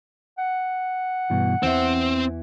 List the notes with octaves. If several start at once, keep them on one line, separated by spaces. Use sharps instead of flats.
F#5
G2 B2 E3
E2 E3 C4 E5